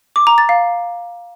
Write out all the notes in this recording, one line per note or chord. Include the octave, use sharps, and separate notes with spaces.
D6
A#5
A6
F5